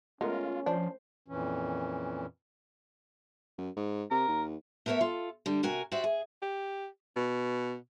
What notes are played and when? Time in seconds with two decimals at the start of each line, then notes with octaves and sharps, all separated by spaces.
0.21 G#3 A3 B3 C#4 F4 A#4
0.66 F3 D4 C5
1.28 F2 A#2 E3 C#4
3.58 F#2
3.76 G#2
4.11 C3 A#4
4.28 D#2
4.86 A3 B3 A#4 C5 C#5 E5
5.01 F4 A4
5.46 D3 G3
5.63 C3 F#4 A#4 G#5
5.92 F#4 G4 C5 D5 E5
6.04 G#4
6.42 G4
7.16 B2